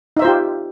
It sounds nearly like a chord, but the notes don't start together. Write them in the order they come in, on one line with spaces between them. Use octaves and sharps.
D#4 E5 C5 F4 G4